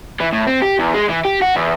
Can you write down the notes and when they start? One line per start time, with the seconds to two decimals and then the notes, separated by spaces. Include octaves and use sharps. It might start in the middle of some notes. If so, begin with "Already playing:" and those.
0.20 E3
0.33 A2
0.47 C4
0.62 G4
0.79 E2
0.93 G#3
1.09 E3
1.25 G4
1.42 F#4
1.56 E2